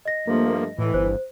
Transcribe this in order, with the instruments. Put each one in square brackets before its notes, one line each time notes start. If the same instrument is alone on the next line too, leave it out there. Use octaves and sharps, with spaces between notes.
[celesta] D#5 A#6
[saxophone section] G2 F3 A3 [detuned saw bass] A#3
[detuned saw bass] A2 [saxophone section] E3
[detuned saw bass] G1 [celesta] C5